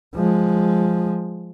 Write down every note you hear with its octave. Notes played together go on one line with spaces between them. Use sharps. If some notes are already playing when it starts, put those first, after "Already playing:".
F3 G#3